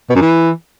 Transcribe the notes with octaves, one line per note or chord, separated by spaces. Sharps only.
B2
F#2
E3